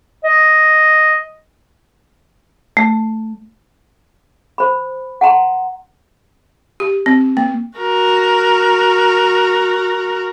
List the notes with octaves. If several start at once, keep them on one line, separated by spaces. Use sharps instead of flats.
D#5
A3
C5 B5
F#5 A5 A#5 C6
G4
C4
A#3
F#4 A#4